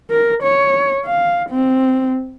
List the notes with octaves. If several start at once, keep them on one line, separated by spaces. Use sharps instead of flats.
A#4
C#5
F5
C4